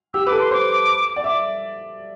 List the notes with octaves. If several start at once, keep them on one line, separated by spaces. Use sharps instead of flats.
G4 E6
B4 D6
A4
C6
C5 D6
D5
E5 D6